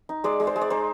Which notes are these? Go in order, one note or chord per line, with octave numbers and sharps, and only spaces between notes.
D#4
G#3 D5
G#3
C5
G#3
D5
D#4 C5